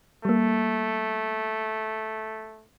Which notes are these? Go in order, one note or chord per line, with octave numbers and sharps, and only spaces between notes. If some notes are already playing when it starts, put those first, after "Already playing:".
G3 A3 A#3